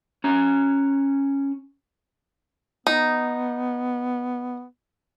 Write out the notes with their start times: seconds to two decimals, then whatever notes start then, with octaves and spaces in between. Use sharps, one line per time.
0.24 C#4 A#5
2.87 B3 D#4